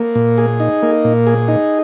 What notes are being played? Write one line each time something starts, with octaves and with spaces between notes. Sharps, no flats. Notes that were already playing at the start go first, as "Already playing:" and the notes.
Already playing: A#3
A#2
G#4
D#4
A#3
A#2
G#4
D#4